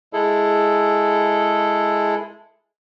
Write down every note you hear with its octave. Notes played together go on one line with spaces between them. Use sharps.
G#3 E4 G#4 A4